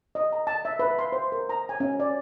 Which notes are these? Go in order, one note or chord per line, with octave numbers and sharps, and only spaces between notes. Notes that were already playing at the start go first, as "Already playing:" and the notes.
D#5
A#5
A5
E5
B4
C6
C5
A#4
A#5
G#5
C#4
D5